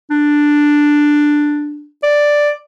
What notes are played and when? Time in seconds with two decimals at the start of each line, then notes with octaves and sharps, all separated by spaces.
0.11 D4
2.03 D5